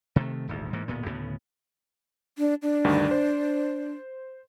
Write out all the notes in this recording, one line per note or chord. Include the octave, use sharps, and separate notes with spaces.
C3 D#3 G3 A3
D#1 G#1 D2
G#2 E3 A#3
D1 A#2 B3
D2 A2 C#3 B3
D4
D4
D2 G2 D#3
C5